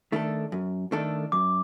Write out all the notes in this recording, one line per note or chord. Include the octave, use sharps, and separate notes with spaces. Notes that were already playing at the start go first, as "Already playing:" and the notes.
D#3 A3 D4 A4
F#2
D#3 A3 D4 A4
F#2 D6